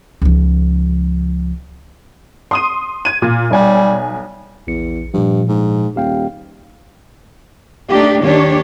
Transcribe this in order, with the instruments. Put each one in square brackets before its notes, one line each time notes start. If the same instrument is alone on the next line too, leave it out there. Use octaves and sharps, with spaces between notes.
[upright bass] C#2 F3
[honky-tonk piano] C6 D#6 D#7
G#6 D#7
A#2
[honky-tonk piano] B1 C#5 G#5 [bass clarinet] G3
[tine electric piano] A#1 C#7 [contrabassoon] E2
[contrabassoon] G2 [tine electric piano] A#2 F3
[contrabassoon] G#2
[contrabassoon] D#1 [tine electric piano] G4 F5 G5
[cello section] A3 D4 D#4 G4
D#2 D#3 D4 G4 C#5